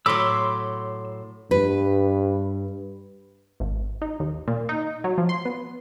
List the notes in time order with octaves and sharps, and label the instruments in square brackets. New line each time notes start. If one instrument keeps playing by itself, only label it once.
[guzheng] A2 F#3 [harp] B5 D6 [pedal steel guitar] C6 E6
[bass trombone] G2 [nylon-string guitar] B4
[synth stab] G#1
D#4
D#2
A#2
D#4
F#3
F3
C6
B3